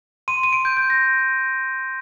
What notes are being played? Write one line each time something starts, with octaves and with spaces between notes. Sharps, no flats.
C6 D#7
D#7
D7
G6
G6
A#6